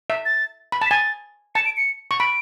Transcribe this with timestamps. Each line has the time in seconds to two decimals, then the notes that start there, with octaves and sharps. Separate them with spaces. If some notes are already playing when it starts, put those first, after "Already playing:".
0.10 E5
0.25 A6
0.72 B5
0.81 A5
0.86 B6
0.91 G#5 A6
1.55 A5 C#7
1.66 D7
1.77 C#7
2.11 C#6
2.20 B5 D7